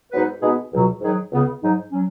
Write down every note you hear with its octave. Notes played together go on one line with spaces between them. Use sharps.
G#2 F#3 B3 D#4 B4
B2 G#3 B3 D#4 G#4
C#2 B2 F#3
G#2 D#3 F#3 D#4 G#4
C#2 C#3 B3
G#2 F#3 D#4
F#3 C#4